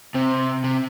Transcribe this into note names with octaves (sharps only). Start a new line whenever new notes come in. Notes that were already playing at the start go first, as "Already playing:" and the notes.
C3 C4
C3